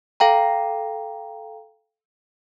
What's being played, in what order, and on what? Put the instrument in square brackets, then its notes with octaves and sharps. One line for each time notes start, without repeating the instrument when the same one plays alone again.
[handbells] A4 F5 G5 A#5